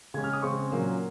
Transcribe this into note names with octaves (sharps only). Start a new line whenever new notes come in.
C#3 G#3 C#4 G#6
F6
D#6
C#3 G#3 C4 C#6
A#2 F#3 A#3 C#4